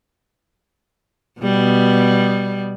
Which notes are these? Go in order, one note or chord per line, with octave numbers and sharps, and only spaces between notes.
B2 G3 B3